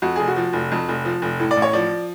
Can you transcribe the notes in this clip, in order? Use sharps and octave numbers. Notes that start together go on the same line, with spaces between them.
F2 F#4
F1 G#4
F#4
F3
F1
F2
F1
F3
F1
A2
D5
A1
C#5
F3 D5